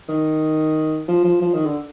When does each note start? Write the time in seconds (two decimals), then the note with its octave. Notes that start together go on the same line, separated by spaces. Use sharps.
0.08 D#3
1.08 F3
1.24 F3
1.41 F3
1.53 D#3
1.66 D3